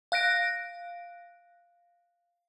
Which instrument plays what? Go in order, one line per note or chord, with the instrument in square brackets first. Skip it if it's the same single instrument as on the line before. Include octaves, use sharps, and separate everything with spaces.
[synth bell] F5 F#6 A#6 D7